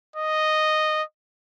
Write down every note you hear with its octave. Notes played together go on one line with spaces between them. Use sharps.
D#5